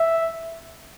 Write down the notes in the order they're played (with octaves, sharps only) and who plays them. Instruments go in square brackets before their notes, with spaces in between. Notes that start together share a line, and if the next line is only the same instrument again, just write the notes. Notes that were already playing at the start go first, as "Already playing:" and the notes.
Already playing: [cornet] E5